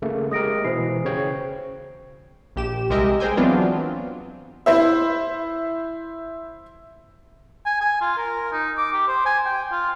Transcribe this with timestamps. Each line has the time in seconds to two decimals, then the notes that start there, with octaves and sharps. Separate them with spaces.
0.02 C#3 A3 A#3
0.31 G#3 G4 A#4 D#6 A#6 D7
0.64 B2 E3 E4 C5 C7
1.05 C#3 C#5 G5
2.56 A#1 G4 E7
2.90 C2 G#3 G4 A#4 D#5 E5
3.20 G#3 A#4 C5 G5 G#5
3.37 E3 F#3 B3 C4 D4 F4
4.66 E4 C5 E5
7.66 G#5
7.81 G#5
8.01 F4
8.17 A#4
8.52 D#4
8.77 D6
8.93 G4
9.08 C5
9.26 G#5
9.46 G5
9.72 F4